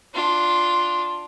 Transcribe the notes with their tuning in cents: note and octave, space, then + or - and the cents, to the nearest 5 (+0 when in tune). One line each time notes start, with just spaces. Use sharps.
D4 +0 F4 +0